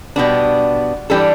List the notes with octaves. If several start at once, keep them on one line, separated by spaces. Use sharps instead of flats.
B2 G3 B3 D4
E3 G3 D4 A4